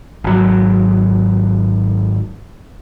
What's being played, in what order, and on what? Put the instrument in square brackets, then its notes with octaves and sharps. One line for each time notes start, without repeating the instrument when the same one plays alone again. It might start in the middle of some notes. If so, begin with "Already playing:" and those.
[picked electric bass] G#1 F#3